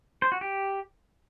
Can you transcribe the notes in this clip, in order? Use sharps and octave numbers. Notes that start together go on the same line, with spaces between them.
C5
F#4
G4